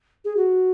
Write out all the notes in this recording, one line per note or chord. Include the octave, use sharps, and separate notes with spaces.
G#4
F#4